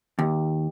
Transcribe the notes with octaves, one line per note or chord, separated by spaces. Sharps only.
D#2